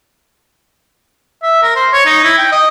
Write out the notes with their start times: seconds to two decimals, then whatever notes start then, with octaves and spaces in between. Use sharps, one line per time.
1.43 E5
1.63 A#4
1.76 C5
1.93 C#5
2.06 D#4
2.24 E4
2.38 G5
2.52 D#5